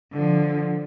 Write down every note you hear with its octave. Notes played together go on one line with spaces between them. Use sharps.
D3 F3